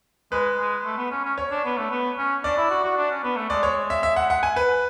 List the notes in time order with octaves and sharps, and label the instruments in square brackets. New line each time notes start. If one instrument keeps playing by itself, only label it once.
[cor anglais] G#3 [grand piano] B4
[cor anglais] G#3
A3
B3
C#4
C#4
[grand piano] C#5
[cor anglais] D4
B3
A3
B3
C#4
[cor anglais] D4 [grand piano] D5
[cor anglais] E4
F#4
F#4
D4
C#4
B3
A3
[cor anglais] G#3 [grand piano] D5
[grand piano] C#5
E5
E5
F#5
F#5
G#5
B4